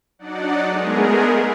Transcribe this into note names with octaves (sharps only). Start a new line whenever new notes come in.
F#3 D4 D#4 D5 F#5
G#3 A3 B3 G#4 A#4